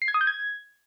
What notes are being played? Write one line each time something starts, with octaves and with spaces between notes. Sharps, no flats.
C7
G#6
D#6
G6
G#6